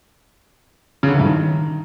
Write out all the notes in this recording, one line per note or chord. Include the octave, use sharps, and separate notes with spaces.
C#3
D3
E3
G2
D#3